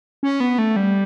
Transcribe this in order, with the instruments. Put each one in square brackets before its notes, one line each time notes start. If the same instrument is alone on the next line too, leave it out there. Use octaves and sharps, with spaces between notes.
[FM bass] C#4
B3
A3
G3